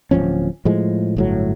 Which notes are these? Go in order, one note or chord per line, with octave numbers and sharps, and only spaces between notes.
D1 C#2 F3 C#4
A2 F3 G#3
G1 A2 F#3